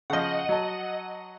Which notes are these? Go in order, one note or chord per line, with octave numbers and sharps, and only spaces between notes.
C#3 F3 D#5 F#5
F#3 A5